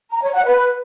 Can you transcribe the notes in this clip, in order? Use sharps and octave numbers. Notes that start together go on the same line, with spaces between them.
A#5
C#5
F#5
B4